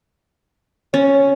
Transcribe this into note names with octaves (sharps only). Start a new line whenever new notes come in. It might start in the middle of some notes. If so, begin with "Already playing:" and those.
C#4 C#5